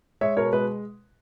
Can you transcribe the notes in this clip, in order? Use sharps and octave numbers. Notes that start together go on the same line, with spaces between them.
G#3 C#5 E5
B2 A#4 C#5
G#3 B4